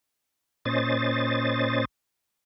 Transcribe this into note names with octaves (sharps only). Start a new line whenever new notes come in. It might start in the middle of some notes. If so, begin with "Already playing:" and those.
A#2 C#4 C5 D#5 A6